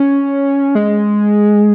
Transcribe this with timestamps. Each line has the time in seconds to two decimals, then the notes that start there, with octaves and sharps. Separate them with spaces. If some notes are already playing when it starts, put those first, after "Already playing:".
Already playing: C#4
0.75 G#3